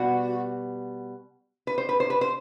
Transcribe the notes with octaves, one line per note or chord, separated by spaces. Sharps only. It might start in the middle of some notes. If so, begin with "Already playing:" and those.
Already playing: B2 G3 B3 F#4
B4
C5
B4
C5
B4
C5